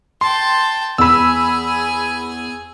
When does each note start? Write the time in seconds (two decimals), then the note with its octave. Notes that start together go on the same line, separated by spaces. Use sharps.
0.21 G5 A5 C6
0.98 E2 G#4 G#5 B5 E6 E7